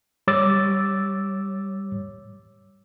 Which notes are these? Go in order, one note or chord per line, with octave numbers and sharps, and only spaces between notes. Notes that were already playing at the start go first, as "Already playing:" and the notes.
G3 C#5 D6 E6 A6